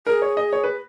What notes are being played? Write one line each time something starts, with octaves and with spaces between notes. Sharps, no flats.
G#4 A#4
C#5
D#5
C#5
B4